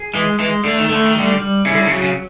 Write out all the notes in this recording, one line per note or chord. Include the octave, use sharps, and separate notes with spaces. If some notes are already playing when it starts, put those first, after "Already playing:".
Already playing: G#4
E3 G#3
E3 G#3
D3 A3
D#3
D3 A3
D#3
D3 G3
G3
C#3 E4
D3
C#3
D3
C#3 F#3
C#3